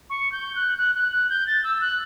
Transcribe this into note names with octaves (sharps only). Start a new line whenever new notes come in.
C#6
G6
F#6
F#6
F#6
F#6
G6
A6
E6
F#6